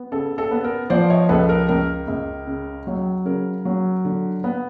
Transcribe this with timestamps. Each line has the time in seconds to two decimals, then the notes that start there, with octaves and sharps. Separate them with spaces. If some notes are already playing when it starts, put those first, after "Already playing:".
Already playing: B3
0.12 C#3 A4
0.38 A4
0.51 B3
0.64 A#4
0.90 F3 C5 D5
1.10 C#5 D#5
1.29 C#2 A4 B4
1.49 A#4
1.68 C#2 A#4
2.08 C#2
2.47 C#3
2.87 F#3
3.25 C#3 A#4
3.65 F#3
4.05 D3
4.44 B3